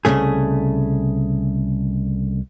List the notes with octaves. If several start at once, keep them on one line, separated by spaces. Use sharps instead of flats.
C2 F2 C#3 A3 G#4